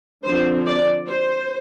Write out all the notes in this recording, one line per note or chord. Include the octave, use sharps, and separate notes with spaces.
D3 F3 C4 C5
D5
C5